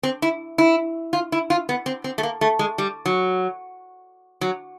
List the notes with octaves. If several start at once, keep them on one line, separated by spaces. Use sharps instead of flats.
C4
E4
E4
F4
E4
F4
B3
C4
C4
A3
A#3
A3
G#3
G3
F#3
F#3